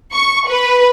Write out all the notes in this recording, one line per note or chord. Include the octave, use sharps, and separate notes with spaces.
C#6
B4